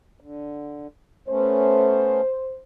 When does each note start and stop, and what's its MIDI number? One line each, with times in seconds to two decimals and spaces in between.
0.20 0.87 50
1.29 2.21 57
1.29 2.21 59
1.29 2.21 61
1.29 2.60 72